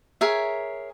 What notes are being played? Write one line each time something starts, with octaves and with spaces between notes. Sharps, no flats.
G#4 A#4 C#5 E5